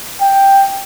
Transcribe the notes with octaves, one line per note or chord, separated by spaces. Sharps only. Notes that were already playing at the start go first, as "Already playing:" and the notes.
G5